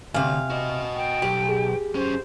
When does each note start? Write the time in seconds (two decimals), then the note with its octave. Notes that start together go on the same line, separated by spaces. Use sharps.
0.14 D2 C3 F5 G#5
0.50 F#4 D#5
0.96 G5
1.22 B1 G4
1.49 G#4
1.95 F#2 C#4 C5